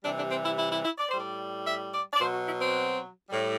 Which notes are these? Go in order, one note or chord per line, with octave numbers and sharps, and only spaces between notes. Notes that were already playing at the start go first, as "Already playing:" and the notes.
C3 E3 G3 D4
D4
C4
E4
E4
E4
E4
D5
A2 G3 C5
D5
E5
D5
D5
B2 F#3 C5
F#4
E4
C4
A2 G3